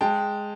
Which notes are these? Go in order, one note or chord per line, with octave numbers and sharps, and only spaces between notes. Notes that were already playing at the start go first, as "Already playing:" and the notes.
G#3 G5 A5